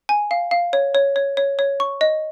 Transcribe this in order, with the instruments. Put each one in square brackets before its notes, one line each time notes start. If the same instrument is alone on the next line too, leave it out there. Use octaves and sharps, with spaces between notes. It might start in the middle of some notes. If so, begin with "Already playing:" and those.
[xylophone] G#5
F5
F5
C#5
C#5
C#5
C#5
C#5
C#6
D#5